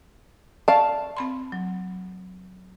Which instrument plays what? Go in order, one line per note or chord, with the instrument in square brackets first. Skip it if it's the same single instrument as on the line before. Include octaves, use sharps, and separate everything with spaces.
[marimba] D5 C#6 [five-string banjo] F5 A5
[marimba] C4 B5 C6
F#3